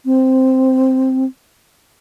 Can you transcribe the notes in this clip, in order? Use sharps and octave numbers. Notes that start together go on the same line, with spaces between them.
C4